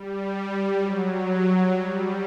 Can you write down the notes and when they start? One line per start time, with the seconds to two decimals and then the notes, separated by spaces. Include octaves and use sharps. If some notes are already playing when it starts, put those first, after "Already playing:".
Already playing: G3
0.78 F#3
1.70 G3